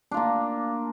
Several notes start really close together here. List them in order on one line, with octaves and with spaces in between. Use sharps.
D4 F4 A#3